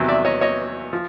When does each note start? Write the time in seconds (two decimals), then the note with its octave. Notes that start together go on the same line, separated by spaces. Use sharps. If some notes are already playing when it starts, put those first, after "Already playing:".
Already playing: E2 C3 D#3 F#3
0.08 D5 E5
0.25 C#5 D#5
0.41 C#5 D#5
0.93 F3